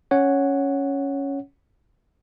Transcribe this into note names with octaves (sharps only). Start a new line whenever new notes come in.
C#4 C#5 F#5